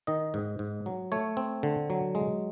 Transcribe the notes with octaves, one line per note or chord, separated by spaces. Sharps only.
D#3 D#5
G#2
G#2
F#3
A3 C#5
C4
D3
F#3
G#3